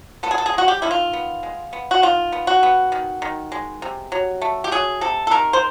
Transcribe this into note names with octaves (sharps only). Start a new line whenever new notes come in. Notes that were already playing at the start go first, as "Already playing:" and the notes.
B3 A4
G#4
A4
G#4
G#3 F#4
G4
D#3 E4
F4
B3
G#3
B3
F#4
D#3 F4
B3
F#4
B3
D#3
D#3
G#3
C3
F#3
A3
G4
F#3 G#4
C3 A4
A4
D#3 A#4
C5